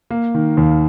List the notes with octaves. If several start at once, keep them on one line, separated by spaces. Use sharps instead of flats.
A#3
D#3
D#2